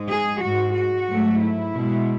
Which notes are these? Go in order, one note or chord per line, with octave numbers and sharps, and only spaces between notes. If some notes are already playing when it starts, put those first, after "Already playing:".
Already playing: G#2 G#3
G#4
G#2 G#3 F#4
F#4
G#2 F#3 A3
E4
B2 G#3